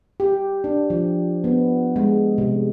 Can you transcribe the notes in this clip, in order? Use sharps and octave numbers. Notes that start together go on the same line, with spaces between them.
G4
D4
F3
B3
G#3
C3